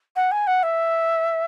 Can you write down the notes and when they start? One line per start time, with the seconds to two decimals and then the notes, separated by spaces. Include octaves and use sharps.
0.16 F#5
0.31 G#5
0.47 F#5
0.63 E5